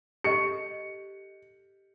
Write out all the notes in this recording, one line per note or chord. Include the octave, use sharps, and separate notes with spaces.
G4 A4 D#5 C#7